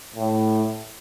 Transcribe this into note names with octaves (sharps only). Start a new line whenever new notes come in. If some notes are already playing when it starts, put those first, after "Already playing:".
A2